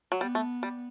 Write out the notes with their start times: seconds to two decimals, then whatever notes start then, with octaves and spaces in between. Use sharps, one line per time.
0.12 F#3
0.21 G3 B3
0.35 A3
0.63 G3